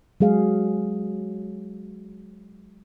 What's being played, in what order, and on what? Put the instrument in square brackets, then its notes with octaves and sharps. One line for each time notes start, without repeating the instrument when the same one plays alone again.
[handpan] F#3 G#3 G#4 F5